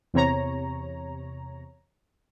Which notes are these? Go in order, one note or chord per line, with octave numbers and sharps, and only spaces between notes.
E2 C3 C#5 A#5